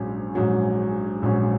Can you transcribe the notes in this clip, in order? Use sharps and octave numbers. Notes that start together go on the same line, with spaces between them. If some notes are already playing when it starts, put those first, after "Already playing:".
Already playing: A#1 G#2 F#3 C#4
A#1 G#2 F#3 C#4
A#1 G#2 F#3 C#4